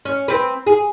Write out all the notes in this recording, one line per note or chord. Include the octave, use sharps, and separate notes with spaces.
C#4
C4 B4
G#4